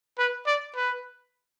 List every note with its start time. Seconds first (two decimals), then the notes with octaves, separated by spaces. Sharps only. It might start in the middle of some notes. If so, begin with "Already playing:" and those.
0.18 B4
0.47 D5
0.76 B4